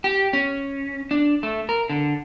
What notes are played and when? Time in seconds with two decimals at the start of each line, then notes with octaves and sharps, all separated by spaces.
0.04 G4
0.33 C#4
1.11 D4
1.43 A3
1.69 A#4
1.90 D3